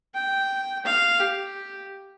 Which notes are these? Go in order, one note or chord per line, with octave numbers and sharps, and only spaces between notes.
G5
F5
G4